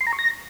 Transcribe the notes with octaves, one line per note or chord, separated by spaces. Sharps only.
C6
A#5
C#6
A#6